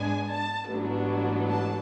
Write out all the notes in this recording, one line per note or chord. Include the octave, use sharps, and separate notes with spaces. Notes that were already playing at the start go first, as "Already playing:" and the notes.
Already playing: G#2 G#3 B3 D4 G#5
A5
A1 G#2 F#3 B3 D4
A5